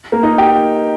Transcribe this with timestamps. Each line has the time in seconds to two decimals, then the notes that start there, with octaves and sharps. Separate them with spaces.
0.12 A#3 A#4
0.23 D#4 D#5
0.38 G4 G5